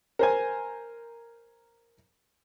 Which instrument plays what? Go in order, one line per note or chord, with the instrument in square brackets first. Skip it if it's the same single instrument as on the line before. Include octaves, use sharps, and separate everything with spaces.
[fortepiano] A#4 C5 G#5